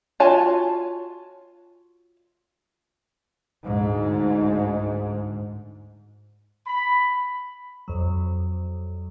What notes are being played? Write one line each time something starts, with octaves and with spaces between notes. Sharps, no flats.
F4 F#4 C#5 G#5 A5
D2 G#2
B5
F2 F#3